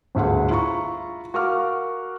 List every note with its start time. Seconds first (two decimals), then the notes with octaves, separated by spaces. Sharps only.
0.15 G1 D2 G#4 F#5
0.50 E4 F4 A#5 C#6
1.34 F#4 A#4 F5 D6 F6